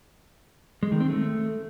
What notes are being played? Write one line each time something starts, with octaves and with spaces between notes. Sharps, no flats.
G#3
D#3
C4
A3